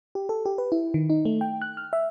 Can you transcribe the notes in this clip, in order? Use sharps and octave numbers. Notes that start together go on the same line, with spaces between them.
G4
A4
G4
B4
E4
D#3
D#4
A3
G5
F#6
F6
E5